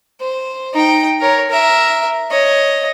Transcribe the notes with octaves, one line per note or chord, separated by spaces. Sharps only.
C5
D#4 G5
A#4 C#5
A#4 E5
C#5 D#5